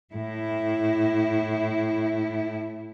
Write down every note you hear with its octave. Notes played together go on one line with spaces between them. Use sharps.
A2 E4